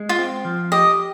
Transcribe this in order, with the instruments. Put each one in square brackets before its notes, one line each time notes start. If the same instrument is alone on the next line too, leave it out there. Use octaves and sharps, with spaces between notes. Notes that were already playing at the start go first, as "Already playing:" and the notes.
Already playing: [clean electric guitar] G#3
[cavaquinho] F4
[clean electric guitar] C4
F3
[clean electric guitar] G4 [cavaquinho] D#5